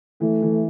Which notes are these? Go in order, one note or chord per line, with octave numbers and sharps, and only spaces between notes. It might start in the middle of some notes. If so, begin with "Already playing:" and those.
E3 A3
E3